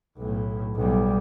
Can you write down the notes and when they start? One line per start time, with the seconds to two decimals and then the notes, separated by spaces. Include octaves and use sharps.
0.17 B1 A2
0.76 B1 G3